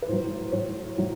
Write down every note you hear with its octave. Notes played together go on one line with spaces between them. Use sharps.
B4
A2 F#3 C5
A2 F#3 C#5
A2 F#3